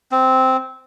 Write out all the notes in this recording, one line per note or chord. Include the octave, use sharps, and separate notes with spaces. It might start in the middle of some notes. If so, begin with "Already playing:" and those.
C4